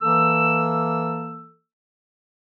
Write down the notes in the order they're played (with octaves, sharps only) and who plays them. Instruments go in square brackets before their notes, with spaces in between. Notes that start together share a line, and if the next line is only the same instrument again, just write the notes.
[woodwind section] E3 A#3 A4 E6